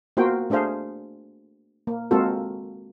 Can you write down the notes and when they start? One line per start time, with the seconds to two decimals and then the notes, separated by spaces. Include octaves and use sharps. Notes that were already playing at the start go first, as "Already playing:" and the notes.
0.17 A#3 B3 F4 F#4 C5 G5
0.50 A3 D4 G#4 C5 F5
1.87 A#3
2.11 G#3 A#3 C4 F4 F#4 A4